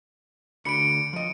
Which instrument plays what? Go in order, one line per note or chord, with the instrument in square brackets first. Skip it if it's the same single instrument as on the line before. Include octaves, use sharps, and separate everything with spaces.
[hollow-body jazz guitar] D2 D3 B5 [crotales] C#7 D7
[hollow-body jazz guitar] F3 D#5